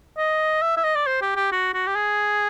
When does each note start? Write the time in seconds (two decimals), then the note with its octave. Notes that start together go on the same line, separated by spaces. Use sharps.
0.17 D#5
0.62 E5
0.77 E5
0.84 D#5
0.95 D5
1.06 C5
1.22 G4
1.36 G4
1.52 F#4
1.74 F#4
1.87 G4
1.95 G#4